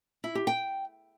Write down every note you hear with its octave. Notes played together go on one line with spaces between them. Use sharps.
E4
G4
G5